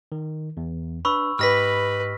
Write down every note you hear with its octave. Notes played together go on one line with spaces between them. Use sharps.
D#3
E2
D4 B4 B5 C#6 E6
G#2 G4 B4 D#5 F6 A#6 B6